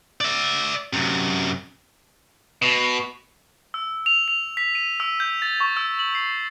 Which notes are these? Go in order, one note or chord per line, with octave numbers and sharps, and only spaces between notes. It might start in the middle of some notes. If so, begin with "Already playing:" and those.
D5 E5
F#2 C3
B2
E6
F7
F7
B6
D#7
E6
G6
A6
C#6
E6
F#7
C7